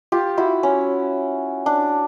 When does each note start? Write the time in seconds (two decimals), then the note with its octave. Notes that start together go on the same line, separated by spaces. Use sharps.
0.12 F4 G4
0.38 E4 F#4
0.63 C#4
1.66 D4